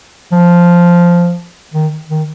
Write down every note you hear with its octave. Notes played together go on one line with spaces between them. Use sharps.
F3
D#3
D#3